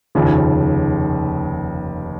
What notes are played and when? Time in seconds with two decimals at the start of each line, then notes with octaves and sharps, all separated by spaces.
0.15 F1 D#2 C#3 F3